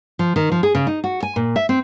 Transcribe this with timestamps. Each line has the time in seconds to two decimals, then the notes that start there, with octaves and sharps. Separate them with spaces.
0.19 F3
0.36 D#3
0.52 F3
0.63 G#4
0.75 C#3
0.87 D#4
1.04 F#4
1.23 G#5
1.36 A#2
1.56 E5
1.69 C4